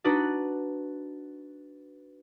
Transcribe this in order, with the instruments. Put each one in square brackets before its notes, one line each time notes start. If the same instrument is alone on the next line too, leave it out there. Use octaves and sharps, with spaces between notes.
[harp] D4 D#4 F#4 B4 D5